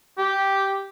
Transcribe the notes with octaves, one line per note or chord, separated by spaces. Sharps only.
G4